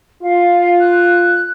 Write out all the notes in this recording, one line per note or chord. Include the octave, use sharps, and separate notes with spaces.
F4 F5
F#6